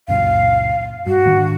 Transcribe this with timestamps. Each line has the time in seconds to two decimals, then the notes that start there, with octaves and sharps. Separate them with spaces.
0.08 C#2 F#2 A#2 F5
1.06 G2 F#4
1.25 G#2 D#3 D4